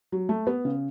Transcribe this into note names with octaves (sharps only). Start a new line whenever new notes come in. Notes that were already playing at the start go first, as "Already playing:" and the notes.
F#3
A3
B3
C#3